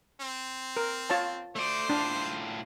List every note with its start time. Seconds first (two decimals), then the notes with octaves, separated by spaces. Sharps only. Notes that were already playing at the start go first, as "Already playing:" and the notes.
0.21 C4
0.77 A#4
1.10 F4 C#5 A5
1.56 A3 C5 D5
1.89 A2 D4 F4